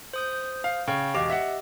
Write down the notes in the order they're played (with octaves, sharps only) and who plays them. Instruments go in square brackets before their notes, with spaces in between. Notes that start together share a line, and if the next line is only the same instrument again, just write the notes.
[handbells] C5 D#6 G6
[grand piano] F5
[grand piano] C#3 [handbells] G5 C#6
[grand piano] E1 F5 D6 [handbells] G4 D#5
[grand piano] E5 F#5